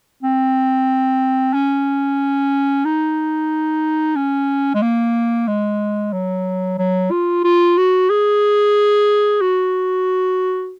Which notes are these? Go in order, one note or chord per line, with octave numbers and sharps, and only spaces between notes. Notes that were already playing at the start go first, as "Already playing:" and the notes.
C4
C#4
D#4
C#4
G#3
A#3
G#3
F#3
F#3
F4
F4
F#4
G#4
F#4